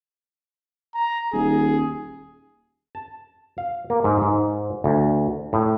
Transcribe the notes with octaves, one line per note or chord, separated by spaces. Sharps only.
A#5
D#1 G#4
A5
F5
A#3
G#2
G#2
D2
A2